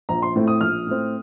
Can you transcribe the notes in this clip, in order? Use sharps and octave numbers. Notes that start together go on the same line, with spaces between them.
A#1 A#5
C6
A2 A3 C4
D#6
A#1 F6
A2 A3 C4